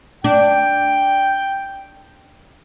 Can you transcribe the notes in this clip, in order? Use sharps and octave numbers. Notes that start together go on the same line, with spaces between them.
D4 G5